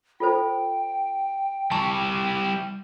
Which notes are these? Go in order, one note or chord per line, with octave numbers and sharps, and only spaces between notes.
F4 A4 C5 G5
G3 E4 A5 C#6